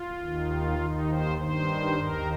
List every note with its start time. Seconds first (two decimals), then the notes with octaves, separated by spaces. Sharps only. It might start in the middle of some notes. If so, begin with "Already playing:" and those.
Already playing: F4
0.19 D#2 D#3
0.78 D#2 D#3 D#4
1.08 C5
1.38 G2 D#3 C5
1.97 D#2 D#3 A#4